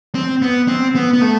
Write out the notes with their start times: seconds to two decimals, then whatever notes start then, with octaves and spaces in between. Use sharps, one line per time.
0.15 C4
0.42 B3
0.68 C4
0.95 B3
1.13 B3
1.21 A3